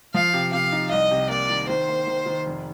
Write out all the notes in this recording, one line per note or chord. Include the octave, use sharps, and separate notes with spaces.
F3 F5
C3
C3 F5
D#4
C2 D#5
C3
A#3 D5
D#3
D#3 C5
A#3
D#3
D#3
F1